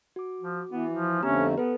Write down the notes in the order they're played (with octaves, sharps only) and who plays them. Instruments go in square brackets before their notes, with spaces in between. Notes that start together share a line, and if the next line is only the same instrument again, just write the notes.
[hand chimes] F#4 D6
[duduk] F3
[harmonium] E3 [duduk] B3
[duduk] F3
[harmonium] F2 D3 A3 [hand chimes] B3 G4 A#5 [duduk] C#4
[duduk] B3 [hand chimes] A4 B4